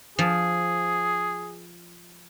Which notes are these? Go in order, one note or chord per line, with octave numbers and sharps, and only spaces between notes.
F3 G#4